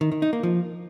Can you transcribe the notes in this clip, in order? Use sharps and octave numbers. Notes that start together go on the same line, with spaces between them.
D#3
D#3
D#4
A#3
F3